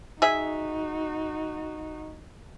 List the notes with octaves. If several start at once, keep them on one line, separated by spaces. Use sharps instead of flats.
D#4 F#4 G#4 E5